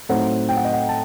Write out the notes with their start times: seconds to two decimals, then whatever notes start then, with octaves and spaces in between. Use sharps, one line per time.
0.09 A2 F#3 C4 D#4 F#5
0.49 G5
0.57 F#5
0.65 D#5
0.73 F#5
0.89 A5